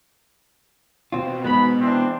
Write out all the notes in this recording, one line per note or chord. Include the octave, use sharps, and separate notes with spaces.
B2 C4 F4
G#2 G#3 B3 B5
E3 C4 D4